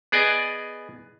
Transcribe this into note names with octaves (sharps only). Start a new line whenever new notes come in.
B3 G#4 D5 D#5 G#5